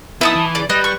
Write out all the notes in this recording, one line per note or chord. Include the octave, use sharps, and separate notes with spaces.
B3 D#4 E4 E5 A5 D#6
E3
C#3 D5
G3 B4 D#5
C#6